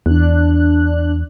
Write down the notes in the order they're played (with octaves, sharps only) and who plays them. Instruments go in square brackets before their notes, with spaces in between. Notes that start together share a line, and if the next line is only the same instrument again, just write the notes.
[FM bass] E2 [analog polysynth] D4 F#6